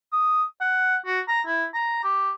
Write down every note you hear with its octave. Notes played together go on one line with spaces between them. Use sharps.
D#6
F#5
F#4
A#5
E4
A#5
G4